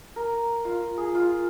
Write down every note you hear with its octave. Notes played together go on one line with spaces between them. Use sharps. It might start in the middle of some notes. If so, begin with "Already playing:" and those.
A#4
F4
G#4
F4